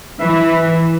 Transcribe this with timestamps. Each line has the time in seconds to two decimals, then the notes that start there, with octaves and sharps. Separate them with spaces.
0.21 E3 B4 E5